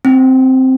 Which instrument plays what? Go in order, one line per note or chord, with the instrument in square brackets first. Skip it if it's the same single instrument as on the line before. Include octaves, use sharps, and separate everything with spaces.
[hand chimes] C4